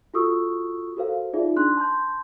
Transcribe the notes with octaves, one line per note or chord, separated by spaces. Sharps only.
F4 F#4 A4 C#6 D#6 E6
F#4 A4 A#4 C5 F5
D#4 F4 G#4 D5 E5
D4 C6 F#6
A5 C6 G6